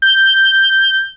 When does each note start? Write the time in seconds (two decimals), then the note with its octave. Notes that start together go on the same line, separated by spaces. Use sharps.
0.02 G6